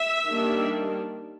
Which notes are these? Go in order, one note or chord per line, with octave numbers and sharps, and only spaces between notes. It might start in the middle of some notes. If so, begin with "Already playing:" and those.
Already playing: E5
D#3 G3 A#3 D4